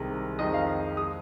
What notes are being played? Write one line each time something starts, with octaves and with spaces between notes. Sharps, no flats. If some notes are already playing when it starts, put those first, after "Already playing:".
Already playing: C2 C3 D#3 G#3
F2 D#3 G#3 D#5
F5
G#3 D#6